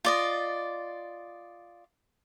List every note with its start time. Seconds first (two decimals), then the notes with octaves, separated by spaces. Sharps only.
0.05 F4 D5 D#5